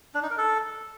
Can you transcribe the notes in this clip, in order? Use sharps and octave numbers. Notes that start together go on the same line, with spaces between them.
D4
D#4
A#4
A4